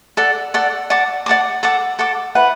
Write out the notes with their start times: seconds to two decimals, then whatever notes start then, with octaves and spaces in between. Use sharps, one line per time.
0.17 A4 D5 F#5
0.54 A4 D5 F#5
0.90 D5 F#5 A5 D6
1.26 D5 F#5 A5 D6
1.63 A4 F#5 A5 D6
1.99 A4 F#5 A5 D6
2.35 E4 B4 F#5